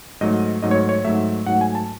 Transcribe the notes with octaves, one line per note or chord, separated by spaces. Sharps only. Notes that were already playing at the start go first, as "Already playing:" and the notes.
G#2 F#3 A3 D#5
G#2 F#3 A3 D#5
C#5
C#5
G#2 F#3 A3 E5
G#2 F#3 A3 F#5
G#5
A5